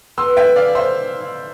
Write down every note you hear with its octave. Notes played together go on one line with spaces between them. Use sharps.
B3 C6 E6
E5 G5
E4
D5 F5
E4
C5 E5
E4
E4